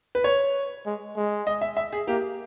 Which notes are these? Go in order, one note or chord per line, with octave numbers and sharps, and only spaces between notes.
B4
C#5
G#3
G#3
D#5
E5
E5
G#4
A#3 G4